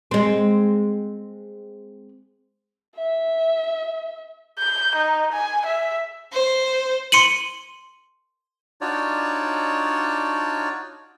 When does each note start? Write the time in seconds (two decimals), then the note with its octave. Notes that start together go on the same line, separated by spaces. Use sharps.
0.11 G#3 C4
2.96 E5
4.58 G6
4.95 D#4
5.33 G#5
5.66 E5
6.33 C5
7.12 C6 C#7 D#7 F#7
8.81 D4 D#4 F4 F#4 C#5 D5